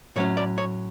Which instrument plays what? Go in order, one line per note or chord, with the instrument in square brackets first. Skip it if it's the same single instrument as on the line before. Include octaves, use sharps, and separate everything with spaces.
[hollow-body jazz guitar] A2 F#3 C#4 C#5
D5
C#5